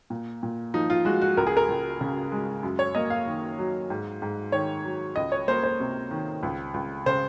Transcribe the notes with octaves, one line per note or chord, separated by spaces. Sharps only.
A#2
A#2
F3 D#4
F4
G#3 F#4
F#4
C#2 A#4
G#4
A#4
C#2
C#3
G#3
F#2
C#5
A#3 D#5
F5
D#3
F#3
G#2
G#2
D#3 C#5
F#3
C#2 D#5
C#5
A#3 C5
C5
C3
D#3
C#2
C#2
C#3 C5